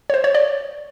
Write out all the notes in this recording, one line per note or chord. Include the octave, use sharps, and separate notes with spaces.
C#5
C5
C#5
D5